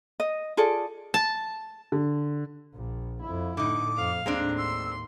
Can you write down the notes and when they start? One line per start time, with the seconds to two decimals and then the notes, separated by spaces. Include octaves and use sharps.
0.20 D#5
0.57 F4 G#4 A4 D5
1.14 A5
1.92 D3
2.75 A#1 A#2
3.22 F2 E4
3.57 A2 D3 D#4 D6
3.97 F2 F5
4.26 D#2 A2 G#3 C4 D4 A#5
4.58 C6 E6